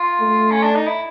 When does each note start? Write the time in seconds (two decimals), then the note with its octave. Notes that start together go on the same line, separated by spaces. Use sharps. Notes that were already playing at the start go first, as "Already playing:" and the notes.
Already playing: F4
0.21 A3
0.51 C#4
0.63 D4
0.75 D#4
0.87 E4